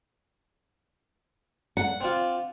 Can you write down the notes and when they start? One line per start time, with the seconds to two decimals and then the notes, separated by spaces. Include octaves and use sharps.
1.77 F#5
2.01 C4 D4 F4